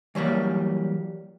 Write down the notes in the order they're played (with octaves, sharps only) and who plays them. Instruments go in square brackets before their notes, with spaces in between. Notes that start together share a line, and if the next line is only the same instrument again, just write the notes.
[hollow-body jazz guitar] E3 F#3 G3 A#3